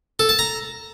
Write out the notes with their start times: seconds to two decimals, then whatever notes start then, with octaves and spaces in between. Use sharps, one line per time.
0.19 A4
0.29 A5
0.39 A#5